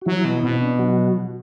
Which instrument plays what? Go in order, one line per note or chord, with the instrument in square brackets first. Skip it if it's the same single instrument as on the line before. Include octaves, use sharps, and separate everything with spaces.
[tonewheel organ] F#4
[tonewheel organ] E3 E4 [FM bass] F#3
[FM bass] B2
[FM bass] B2 [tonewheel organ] C4
[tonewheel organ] D4
F#3 F#4